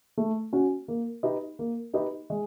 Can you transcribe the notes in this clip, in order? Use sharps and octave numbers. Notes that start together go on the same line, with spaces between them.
A3
C#4 F#4
A#3
D#4 G4 B4 D#5
A#3
D#4 G4 B4 D#5
G#3